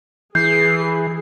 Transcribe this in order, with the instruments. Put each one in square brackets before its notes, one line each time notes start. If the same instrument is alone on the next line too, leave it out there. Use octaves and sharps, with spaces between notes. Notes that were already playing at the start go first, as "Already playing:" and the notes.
[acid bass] E3 [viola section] G#4 [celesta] G6 [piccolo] C7